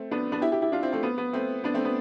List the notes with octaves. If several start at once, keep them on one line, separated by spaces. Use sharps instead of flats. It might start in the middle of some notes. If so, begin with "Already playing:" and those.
Already playing: A3 C4
B3 D4
B3 D4
E4 G4
E4 G4
E4 G4
D4 F4
C4 E4
A3 C4
B3
B3
A3 C4
B3 D4
A3 C4
B3